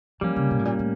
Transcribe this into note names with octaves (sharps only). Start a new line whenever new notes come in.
F3 G3 A#3 C#4
C#3
B2
A2
A#2
A2